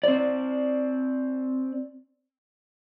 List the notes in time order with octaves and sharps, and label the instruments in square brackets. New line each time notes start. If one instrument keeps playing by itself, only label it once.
[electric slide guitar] C4 D5